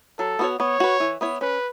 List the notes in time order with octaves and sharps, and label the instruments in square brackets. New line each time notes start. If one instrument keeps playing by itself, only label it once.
[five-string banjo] F#3 [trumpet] A4
[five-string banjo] B3 F#4 C#5
[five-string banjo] B3 [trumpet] C#5
[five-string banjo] F#4 B4
E3
B3 E4 C#5
[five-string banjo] C#4 [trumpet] B4